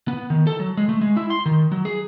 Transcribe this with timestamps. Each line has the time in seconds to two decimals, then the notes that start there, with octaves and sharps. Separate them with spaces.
0.08 B3
0.30 D#3
0.47 A4
0.60 F#3
0.77 G#3
0.89 A3
1.01 G#3
1.16 E4
1.30 C6
1.46 D#3
1.72 F#3
1.85 G#4